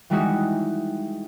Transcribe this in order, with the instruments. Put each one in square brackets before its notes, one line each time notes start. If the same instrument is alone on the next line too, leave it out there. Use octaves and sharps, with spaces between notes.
[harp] E3 G3 G#3 D#4 E4 F#4